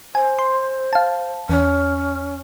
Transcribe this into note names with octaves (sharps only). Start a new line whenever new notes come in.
C5 G#5
C6
F5 A5
E2 C#4